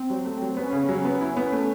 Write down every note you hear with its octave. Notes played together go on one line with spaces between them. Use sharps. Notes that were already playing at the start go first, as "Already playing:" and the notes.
Already playing: C4
F#3
A3
F#3
B3 C#4
C#3
F#3
B3
E4
B3
A3